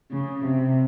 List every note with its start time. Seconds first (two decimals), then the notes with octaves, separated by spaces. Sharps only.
0.12 C#3
0.45 C3